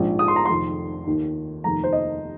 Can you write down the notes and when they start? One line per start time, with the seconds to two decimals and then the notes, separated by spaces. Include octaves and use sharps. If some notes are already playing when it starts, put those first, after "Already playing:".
Already playing: A#1 G#2 F3
0.19 D#6
0.28 C6
0.36 A#5
0.45 F1 F2 D#3 C6
1.07 D#2 D#3
1.64 F1 D#2 D#3 A#5
1.84 C5
1.93 D#5